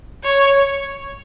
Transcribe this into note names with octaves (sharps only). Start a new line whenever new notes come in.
C#5